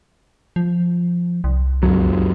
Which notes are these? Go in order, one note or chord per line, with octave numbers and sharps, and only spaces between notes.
F3
C2
C#2 F#2 F#3